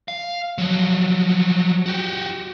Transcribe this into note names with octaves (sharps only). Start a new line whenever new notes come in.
F5
F3 F#3
F#4 G4